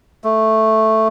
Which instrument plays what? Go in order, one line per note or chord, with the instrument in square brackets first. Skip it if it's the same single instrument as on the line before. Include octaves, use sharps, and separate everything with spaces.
[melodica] A3